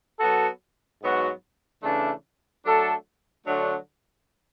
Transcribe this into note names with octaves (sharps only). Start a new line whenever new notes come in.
F#3 B3 F#4 A4
G#2 F#3 B3 F#4
C#3 E3 A3 D4
F#3 A3 D4 A4
D3 F#3 A3 D4 F#4